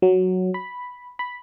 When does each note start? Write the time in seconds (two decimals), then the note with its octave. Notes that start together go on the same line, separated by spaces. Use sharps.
0.02 F#3
0.54 B5
1.19 B5